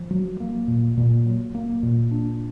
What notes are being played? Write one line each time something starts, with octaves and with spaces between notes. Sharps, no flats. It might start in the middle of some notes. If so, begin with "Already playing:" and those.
Already playing: F3
F#3
A#3
A#2
A#2
F#3
A#3
A#2
D4